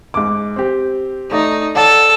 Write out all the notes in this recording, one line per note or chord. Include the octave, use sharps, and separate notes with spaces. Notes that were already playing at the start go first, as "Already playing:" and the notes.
G#2 D6
C4 G4
A3 D#4 D5
A4 D5 F#5 A5